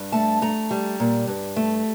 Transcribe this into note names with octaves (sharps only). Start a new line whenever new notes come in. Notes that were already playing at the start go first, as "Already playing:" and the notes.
Already playing: G2
A3 A5
A3 A#5
G3
A#2
G2
A3